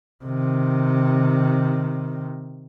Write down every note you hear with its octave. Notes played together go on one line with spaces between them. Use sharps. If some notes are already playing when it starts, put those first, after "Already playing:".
C3 D#3